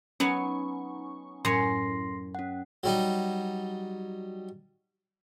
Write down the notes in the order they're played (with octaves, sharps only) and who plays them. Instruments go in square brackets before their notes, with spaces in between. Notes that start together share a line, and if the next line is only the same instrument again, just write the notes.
[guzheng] F#3 B3 C#5 [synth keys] C#4 D#4 C#6
[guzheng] F#2 C#5 [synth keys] A2 [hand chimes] C6 A#6 C7
[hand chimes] C#4 F#5
[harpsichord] F#3 G3 D#4